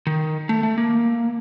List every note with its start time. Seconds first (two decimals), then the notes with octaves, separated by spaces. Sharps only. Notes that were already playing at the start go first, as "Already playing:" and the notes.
0.07 D#3
0.49 A3
0.63 A3
0.78 A#3